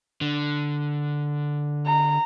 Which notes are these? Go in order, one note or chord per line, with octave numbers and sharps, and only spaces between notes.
D3
A#5